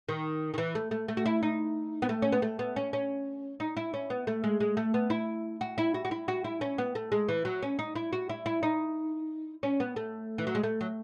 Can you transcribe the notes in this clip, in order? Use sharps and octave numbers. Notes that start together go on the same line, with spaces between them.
D#3
D#3
E3
A3
A3
A3
F#4
E4
D#4
B3
A3
C#4
B3
A3
B3
C#4
C#4
D#4
E4
C#4
B3
A3
G#3
G#3
A3
B3
E4
F#4
E4
F#4
F#4
E4
F#4
E4
C#4
B3
A3
G#3
E3
F#3
C#4
D#4
E4
F#4
E4
E4
D#4
C#4
B3
A3
E3
F#3
G#3
A3
F#3